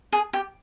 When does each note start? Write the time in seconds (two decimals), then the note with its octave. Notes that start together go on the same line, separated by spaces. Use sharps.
0.13 G#4
0.33 G4